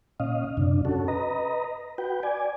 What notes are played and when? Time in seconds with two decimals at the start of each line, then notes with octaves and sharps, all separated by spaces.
0.20 A#2 C#4 D#5 F5
0.57 F#2 C3 D4
0.85 C#4 F#4 A4
1.08 B4 D#5 A#5
1.98 F#4 B4 G5
2.23 D5 G#5